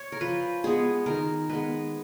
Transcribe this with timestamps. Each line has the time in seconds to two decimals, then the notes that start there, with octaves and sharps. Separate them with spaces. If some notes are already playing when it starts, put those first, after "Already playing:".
Already playing: C#5
0.12 A#4
0.21 F3 B4
0.64 G#3 B3 G#4
1.06 D#3 A#4
1.49 G#3 B3 B4